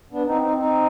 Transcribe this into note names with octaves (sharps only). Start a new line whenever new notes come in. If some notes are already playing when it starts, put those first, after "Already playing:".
B3 D4
C4 D#4
C4 D#4
C4 D#4